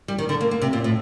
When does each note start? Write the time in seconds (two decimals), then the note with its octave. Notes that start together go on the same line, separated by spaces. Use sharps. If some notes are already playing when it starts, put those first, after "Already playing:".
0.08 G3
0.18 D#3
0.29 D3
0.41 A#3
0.51 A#3
0.62 C3
0.73 A#2
0.84 A2